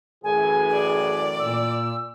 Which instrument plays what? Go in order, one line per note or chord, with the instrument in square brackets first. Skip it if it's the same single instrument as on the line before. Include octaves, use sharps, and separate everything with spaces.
[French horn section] F#2 A2 E3 [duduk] G#4 [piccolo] G#5
[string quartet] D5
[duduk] A#2 [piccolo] E6